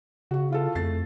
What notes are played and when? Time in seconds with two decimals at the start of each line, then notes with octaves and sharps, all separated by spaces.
0.31 C#3 F#4 C#6
0.50 E4 F4 A4
0.75 F2 A3 A6 C7